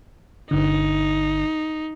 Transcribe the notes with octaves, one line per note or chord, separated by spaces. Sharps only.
G1 D3 D#4